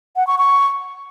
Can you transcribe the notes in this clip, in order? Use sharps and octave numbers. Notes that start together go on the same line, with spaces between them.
F#5
C#6
C#6